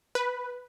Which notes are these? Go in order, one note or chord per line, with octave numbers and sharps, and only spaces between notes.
B4